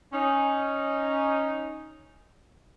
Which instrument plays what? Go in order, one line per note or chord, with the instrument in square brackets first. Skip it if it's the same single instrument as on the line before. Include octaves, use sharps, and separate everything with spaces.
[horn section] C#4 D#4